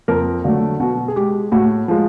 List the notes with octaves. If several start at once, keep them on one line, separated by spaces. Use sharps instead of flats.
F2 A#4
D3 F#3 A3 F#4
B2 F#4
G#4
G#3 G4
A2 F#4
F3 G#3